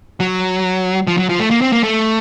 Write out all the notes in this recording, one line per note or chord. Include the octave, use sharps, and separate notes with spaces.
F#3
F3
F#3
F3
A3
A#3
C4
A#3
A3